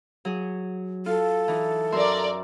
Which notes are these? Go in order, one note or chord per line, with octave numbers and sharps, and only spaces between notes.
F#3 G#4
F4 A4
E3 D#4
F#2 A#4 D5 E5 C6